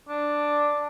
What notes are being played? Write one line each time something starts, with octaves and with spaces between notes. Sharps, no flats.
D4